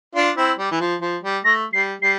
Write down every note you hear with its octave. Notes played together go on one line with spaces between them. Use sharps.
D4 F4
C4 E4
G3
E3
F3
F3
G3
A3 A#6
G3 C7
G3 C7